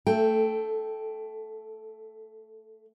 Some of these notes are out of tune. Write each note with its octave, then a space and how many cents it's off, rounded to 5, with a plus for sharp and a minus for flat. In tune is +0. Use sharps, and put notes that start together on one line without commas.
A3 +15 A4 -10 G5 +0